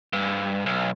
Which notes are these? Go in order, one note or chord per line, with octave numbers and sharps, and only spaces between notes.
G2
B1